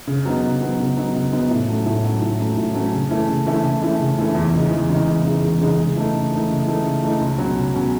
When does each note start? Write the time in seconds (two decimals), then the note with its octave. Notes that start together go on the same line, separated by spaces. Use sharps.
0.07 C#3
0.25 F#3 B3 D#4
0.43 C#3
0.61 F#3 B3 D#4
0.78 C#3
0.97 F#3 B3 D#4
1.14 C#3
1.33 F#3 B3 D#4
1.50 A2
1.68 F#3 A3 C#4
1.86 A2
2.04 F#3 A3 C#4
2.21 A2
2.39 F#3 A3 C#4
2.57 A2
2.74 F#3 A3 C#4
2.92 C#3
3.10 E3 A3 C#4 E4
3.28 C#3
3.46 E3 A3 C#4 E4
3.64 C#3
3.81 E3 A3 C#4 E4
3.99 C#3
4.18 E3 A3 C#4 E4
4.35 E2
4.53 C#3 E3 G#3 D#4
4.71 E2
4.89 C#3 E3 G#3 D#4
5.07 E2
5.25 C#3 E3 G#3 D#4
5.42 E2
5.60 C#3 E3 G#3 D#4
5.78 C#3
5.95 E3 A3 D#4
6.14 C#3
6.31 E3 A3 D#4
6.49 C#3
6.67 E3 A3 D#4
6.85 C#3
7.02 E3 A3 D#4
7.21 C#2
7.38 B2 F#3 C#4
7.56 C#2
7.74 B2 F#3 C#4